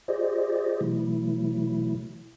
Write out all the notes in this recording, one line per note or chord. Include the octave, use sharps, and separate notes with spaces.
F4 G4 G#4 C5 D5 D#5
B2 E3 F#3 A3 E4